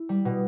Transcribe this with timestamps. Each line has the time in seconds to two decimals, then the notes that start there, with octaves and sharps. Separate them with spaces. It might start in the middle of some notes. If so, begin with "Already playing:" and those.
Already playing: E4
0.09 G3
0.25 B2